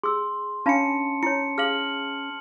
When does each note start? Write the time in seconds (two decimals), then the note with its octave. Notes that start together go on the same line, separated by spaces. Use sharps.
0.03 G#4 C6 E6
0.66 C#4 D4 F5 A5 B5 C#7
1.23 E4 C#5 C#7
1.58 G#4 F5 F6 F#7